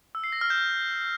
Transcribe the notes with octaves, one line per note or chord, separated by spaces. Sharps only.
E6
C7
A#6
F6
G6